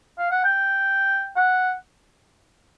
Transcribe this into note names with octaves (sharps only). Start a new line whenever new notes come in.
F5
F#5
G5
F#5